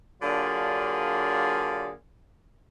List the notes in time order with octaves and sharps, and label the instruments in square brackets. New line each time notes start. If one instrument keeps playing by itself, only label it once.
[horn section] D3 F#3 A#3 D4 F4 G#4